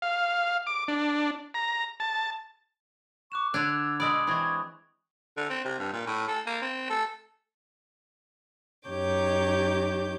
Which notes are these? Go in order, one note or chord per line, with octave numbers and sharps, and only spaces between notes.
F5
D6
D4
A#5
A5
C#6 D6 F#6 E7
D3 D4 E6 F#6 G#6 F7
B2 G#3 D5 B5 D#6
E3 C4 B5 C#6 G#6
D3
C4
C3
G2
A#2
A2
A3
A#3
C4
A3
F#2 D#4 G4 C#5 D6 G6